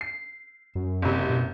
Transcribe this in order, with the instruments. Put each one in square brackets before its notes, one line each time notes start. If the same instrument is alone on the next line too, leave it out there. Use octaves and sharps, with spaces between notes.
[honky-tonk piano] C7
[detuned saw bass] F#2
[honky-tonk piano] F#1 C3
[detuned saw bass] B2